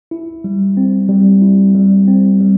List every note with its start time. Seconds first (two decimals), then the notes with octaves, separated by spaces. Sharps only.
0.11 E4
0.44 G3
0.77 C4
1.09 G3
1.41 E4
1.75 G3
2.08 C4
2.40 G3